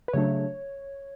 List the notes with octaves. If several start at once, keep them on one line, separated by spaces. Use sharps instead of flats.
B4
C#3 F#3 A3 D4 C#5